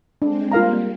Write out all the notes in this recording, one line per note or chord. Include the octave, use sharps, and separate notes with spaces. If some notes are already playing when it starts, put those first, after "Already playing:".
G#3 C4 D4
G3 A#3 F4 A#4 F5 A#5